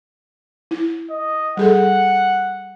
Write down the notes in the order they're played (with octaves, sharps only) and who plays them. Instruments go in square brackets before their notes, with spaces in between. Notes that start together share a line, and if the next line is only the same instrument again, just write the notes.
[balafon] E4
[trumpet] D#5
[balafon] G3 G#4 A4 [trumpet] F#5